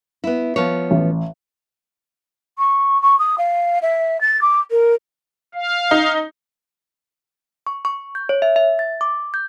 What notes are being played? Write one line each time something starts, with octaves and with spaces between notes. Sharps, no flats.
B3 E4
F3 B3 C#5
A1
C#6
C#6
D#6
F5
E5
A6
D6
A#4
F5
D#4
C#6
C#6
G6
C#5
E5
E5
A6
D6
G6